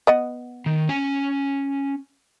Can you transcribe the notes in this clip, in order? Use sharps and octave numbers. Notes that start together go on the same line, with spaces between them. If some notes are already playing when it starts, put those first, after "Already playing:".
B3 D#5 F#5
D#3
C#4 G#5